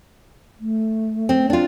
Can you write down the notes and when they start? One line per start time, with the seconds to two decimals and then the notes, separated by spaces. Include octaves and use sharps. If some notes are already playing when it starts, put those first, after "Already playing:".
0.60 A3
1.29 C4
1.50 D4 F4